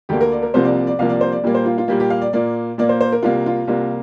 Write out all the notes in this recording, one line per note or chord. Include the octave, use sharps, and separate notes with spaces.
D2 D3 A#3 G4
A#4
D5
A#4
C2 C3 F3 A#3 C5
D5
D5
D5
C2 C3 F3 A#3 F5
D5
C5
D5
A#2 G3 A#3
C5
F4
F4
A#2 G3 A#3 G4
G4
F5
D5
A#2 A#3 D5
A#2 A#3 D5
C5
C5
A#4
C2 C3 A#3 F4
F4
C2 C3 A#3 F4